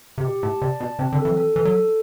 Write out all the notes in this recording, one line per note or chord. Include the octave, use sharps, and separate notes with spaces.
C3
B2 G4
A2 A5
C3 D5
B2 A5
C3 C4
D3
A4
E3
F#3
E3 A4
E3 A4
F#3
A4